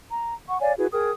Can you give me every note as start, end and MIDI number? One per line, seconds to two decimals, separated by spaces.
0.11 0.33 82
0.48 0.60 78
0.48 0.60 85
0.60 0.73 73
0.60 0.73 74
0.60 0.73 77
0.60 0.73 80
0.77 0.86 64
0.77 0.86 66
0.77 0.86 68
0.77 0.86 71
0.92 1.12 68
0.92 1.12 70
0.92 1.12 79
0.92 1.12 87